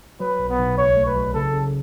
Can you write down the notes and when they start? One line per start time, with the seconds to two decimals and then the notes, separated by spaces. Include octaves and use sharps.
0.20 F#3 B4
0.39 B1
0.50 B3
0.59 B1
0.78 C#2 C#5
0.97 A3
1.06 B4
1.15 F#3
1.34 C#3 A4
1.54 C#3